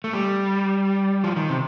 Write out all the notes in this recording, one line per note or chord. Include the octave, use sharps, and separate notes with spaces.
A3
G3
F3
D#3
C3